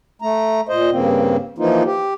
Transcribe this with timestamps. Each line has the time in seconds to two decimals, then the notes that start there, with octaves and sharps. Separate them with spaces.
0.22 A3 A#5
0.69 A#2 C5 D#5
0.91 G2 C#3 A#3 C4
1.58 E3 F3 A#3 D#4 F4
1.85 G4